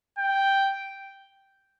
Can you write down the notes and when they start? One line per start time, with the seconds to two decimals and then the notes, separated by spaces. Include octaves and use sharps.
0.18 G5